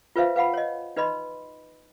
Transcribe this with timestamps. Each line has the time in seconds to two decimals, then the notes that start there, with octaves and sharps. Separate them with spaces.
0.16 F4 B4 C5 E5 F5
0.36 B4 F5 F#5 B5
0.54 C#5 D#5
0.96 D#4 B4 D#5 B5 C6